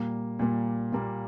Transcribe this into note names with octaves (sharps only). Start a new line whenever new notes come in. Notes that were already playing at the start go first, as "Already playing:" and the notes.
Already playing: A#2 G3 A#3
A#2 G3 A#3
A#2 G3 A#3